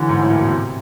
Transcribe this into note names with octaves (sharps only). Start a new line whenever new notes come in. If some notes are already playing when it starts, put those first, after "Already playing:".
Already playing: D3 E3 F#3
G#2
A2
A#2
B2
C3